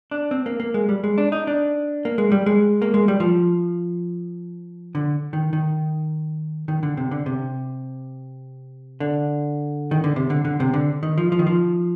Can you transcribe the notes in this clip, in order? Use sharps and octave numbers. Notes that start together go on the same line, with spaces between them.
D4
C4
A#3
A#3
G#3
G3
G#3
D4
D#4
D4
A#3
G#3
G3
G#3
A#3
G#3
G3
F3
D3
D#3
D#3
D#3
D3
C3
D3
C3
D3
D#3
D3
C3
D3
D3
C3
D3
D#3
F3
F3
D#3
F3